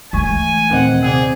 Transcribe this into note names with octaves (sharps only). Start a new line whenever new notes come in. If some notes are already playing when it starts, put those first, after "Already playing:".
E3 G#3 A3 G#5 C#6
D#2 A#2 D#3 C4 F#5
C3 C4 G#4 D5